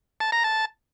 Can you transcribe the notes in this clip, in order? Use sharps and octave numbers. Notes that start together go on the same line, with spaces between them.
A5
A#5
A5